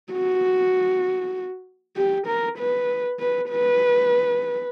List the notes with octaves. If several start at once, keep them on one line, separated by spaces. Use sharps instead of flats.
F#4
G4
A#4
B4
B4
B4